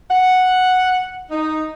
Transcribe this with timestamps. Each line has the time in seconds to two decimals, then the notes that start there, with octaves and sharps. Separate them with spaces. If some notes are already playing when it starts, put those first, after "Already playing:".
0.09 F#5
1.31 D#4